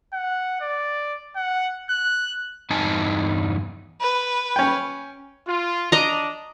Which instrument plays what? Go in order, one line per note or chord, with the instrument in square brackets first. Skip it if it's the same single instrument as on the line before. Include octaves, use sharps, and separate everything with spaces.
[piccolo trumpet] F#5
D5
F#5
F#6
[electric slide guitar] E2 G2 D#4 G#5 A5
[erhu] B4
[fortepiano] C#4 G5
[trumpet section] F4
[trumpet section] D4 [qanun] D#5 A#5